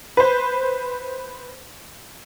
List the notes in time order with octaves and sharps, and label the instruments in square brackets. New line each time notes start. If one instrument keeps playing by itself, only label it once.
[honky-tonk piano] B4 C5